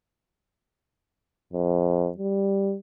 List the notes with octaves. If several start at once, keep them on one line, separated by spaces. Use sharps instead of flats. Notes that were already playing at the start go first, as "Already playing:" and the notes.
F2
G3